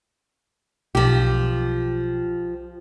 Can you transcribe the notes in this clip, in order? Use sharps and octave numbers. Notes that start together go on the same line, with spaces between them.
B1 F3 G4